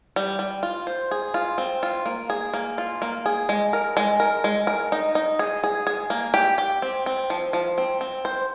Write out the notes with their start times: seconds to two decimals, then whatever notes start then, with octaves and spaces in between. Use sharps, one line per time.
0.16 G3
0.39 G3
0.63 F4
0.87 C5
1.11 G#4
1.34 F4
1.58 C4
1.83 F4
2.06 A#3
2.30 G#4
2.54 A#3
2.78 F4
3.02 A#3
3.26 G#4
3.49 G#3
3.73 A#4
3.97 G#3
4.20 A#4
4.44 G#3
4.67 A#4
4.92 D#4
5.15 D#4
5.39 G#4
5.64 G#4
5.87 G#4
6.10 A#3
6.34 G4
6.58 G4
6.82 C4
7.06 C4
7.30 F3
7.53 F3
7.78 C4
8.01 C4
8.25 C5